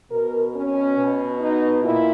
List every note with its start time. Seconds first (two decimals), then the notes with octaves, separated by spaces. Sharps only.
0.11 B2 A#4
0.54 C#4
0.98 B2
1.40 D#4
1.83 A#2 E4